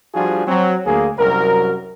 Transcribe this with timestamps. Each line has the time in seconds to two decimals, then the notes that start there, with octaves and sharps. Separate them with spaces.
0.14 F3 G3 D4 F4 F#4 G#4
0.47 F#3 C4
0.86 D2 A#3 G#4
1.18 C2 F#2 F#3 A#4